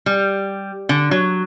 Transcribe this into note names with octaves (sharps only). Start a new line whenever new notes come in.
G3
D3
F#3